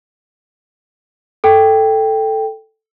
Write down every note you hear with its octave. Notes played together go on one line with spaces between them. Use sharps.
A4 G5